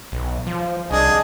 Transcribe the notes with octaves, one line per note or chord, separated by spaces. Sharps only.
B1
F3
C2 D4 G#4 D#5